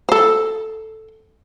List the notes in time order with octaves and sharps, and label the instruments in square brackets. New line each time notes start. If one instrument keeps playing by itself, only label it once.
[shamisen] A4 C5